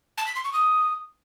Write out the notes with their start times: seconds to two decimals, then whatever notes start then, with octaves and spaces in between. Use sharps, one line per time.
0.18 A5
0.27 B6
0.35 C6
0.44 C#6
0.53 D#6